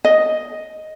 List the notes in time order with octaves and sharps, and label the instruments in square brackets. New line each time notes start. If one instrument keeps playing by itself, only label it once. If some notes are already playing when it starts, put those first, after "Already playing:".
[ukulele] D#5